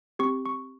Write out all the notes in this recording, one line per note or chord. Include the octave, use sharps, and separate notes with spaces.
C4 G4 C#6
C#6